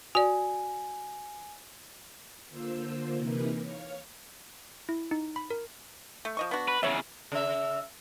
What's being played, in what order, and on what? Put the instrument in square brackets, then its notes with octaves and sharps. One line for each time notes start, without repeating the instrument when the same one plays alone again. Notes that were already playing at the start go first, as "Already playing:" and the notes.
[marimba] F#4 D5 [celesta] G#5
[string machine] D3 A#3 F4 C5 E6
C3 E3 A#3 D#4 A#4 B4
C#5 F5
[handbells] E4
D#4
B5
A#4
[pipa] A3
F3 D#5 C#6
B3 D4 F#4
[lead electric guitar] B4
[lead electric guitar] E2 C#3 [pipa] C#5 E5
[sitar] C#3 E5